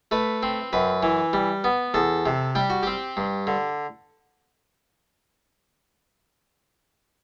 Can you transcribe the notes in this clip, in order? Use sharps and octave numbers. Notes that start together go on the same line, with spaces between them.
A3 B4
C4
F#2 B4
E3
G3
B3
E2 A4
C3
G3 G4
F#4
C4 G4
G2
D3